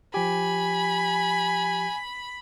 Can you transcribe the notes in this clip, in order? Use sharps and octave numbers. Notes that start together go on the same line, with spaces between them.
F3 G4 G#5 B5